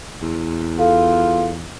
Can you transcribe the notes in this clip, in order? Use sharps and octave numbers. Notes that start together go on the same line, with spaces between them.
E2
F4 A4 F5